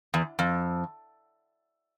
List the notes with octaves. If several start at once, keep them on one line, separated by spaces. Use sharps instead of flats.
E2
F2